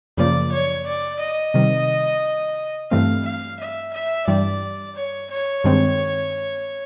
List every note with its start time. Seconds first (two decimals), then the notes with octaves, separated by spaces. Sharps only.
0.17 F#2 C#3 F3 A#3 D5
0.52 C#5
0.86 D5
1.20 D#5
1.54 C3 D#3 G3
2.91 G2 E3 A3 C4 F5
3.25 F5
3.60 E5
3.94 E5
4.27 G2 E3 G3 D5
4.96 C#5
5.31 C#5
5.64 G2 D#3 G#3 C4